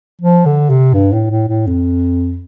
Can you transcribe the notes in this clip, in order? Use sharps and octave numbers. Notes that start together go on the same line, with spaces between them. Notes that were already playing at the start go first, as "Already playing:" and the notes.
F3
D3
C3
G2
A2
A2
A2
F2